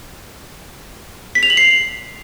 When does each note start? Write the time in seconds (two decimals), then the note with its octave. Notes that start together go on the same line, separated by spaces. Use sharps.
1.35 B6
1.43 F7
1.50 F#7
1.57 C7